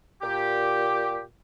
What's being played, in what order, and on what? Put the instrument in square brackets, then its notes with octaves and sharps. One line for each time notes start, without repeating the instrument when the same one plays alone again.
[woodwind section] A#2 G4